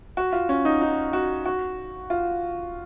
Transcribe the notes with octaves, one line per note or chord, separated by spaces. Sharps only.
F#4
F4
C#4
D#4
D#4
F#4
F#4
F4